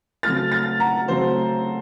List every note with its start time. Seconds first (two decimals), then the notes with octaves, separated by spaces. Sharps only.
0.23 C#3 F#3 A3 C4 F6 A6
0.51 F6 A6
0.80 F#5 A#5
1.08 C#3 F#3 A3 C4 C5